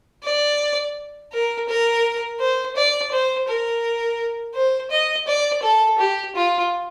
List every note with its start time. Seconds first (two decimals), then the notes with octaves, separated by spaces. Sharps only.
0.24 D5
1.33 A#4
1.68 A#4
2.40 C5
2.76 D5
3.12 C5
3.48 A#4
4.55 C5
4.91 D#5
5.27 D5
5.63 A4
5.99 G4
6.35 F4